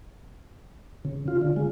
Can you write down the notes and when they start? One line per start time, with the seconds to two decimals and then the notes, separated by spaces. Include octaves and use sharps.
1.05 C#3
1.28 F4
1.41 D3
1.56 G#3